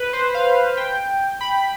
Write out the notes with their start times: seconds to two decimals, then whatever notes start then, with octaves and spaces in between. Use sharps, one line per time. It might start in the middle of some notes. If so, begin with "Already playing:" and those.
Already playing: B4
0.13 C5
0.34 F5
0.77 G5
1.41 B5